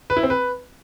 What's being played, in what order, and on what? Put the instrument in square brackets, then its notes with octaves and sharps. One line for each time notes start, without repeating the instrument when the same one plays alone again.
[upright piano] B4
E4
C4
B4